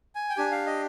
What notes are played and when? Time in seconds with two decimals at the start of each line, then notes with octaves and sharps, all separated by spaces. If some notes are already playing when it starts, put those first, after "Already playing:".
0.15 G#5
0.30 G5
0.37 D4 G4 G#5
0.51 F5
0.66 D#5